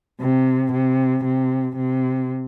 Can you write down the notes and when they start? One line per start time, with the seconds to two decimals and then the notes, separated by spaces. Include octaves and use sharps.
0.21 C3
0.72 C3
1.24 C3
1.76 C3